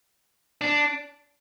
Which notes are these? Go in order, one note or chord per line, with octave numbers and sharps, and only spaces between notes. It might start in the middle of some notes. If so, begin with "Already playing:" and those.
D4